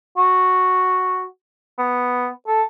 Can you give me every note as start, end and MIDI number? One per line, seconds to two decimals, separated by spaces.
0.17 1.24 66
1.78 2.28 59
2.47 2.62 69